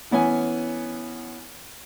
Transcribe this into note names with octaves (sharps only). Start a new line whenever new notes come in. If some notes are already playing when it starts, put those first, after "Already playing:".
E3 B3 C#4 G#5